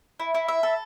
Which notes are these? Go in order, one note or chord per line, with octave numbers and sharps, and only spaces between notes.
E4
E4
E5
A4